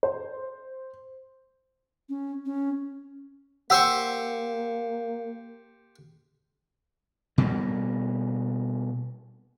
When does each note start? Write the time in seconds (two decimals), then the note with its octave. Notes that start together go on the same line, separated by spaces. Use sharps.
0.03 C5
2.09 C#4
2.46 C#4
3.70 A#3 G4 C5 F#5 C#6 E6
7.38 B2 G3 A#3